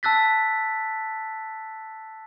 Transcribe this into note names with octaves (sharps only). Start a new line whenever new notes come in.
A5 E6 F#6 A6 B6